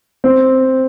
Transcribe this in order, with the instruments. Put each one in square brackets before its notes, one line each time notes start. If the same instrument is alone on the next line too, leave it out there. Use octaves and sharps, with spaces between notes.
[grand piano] C4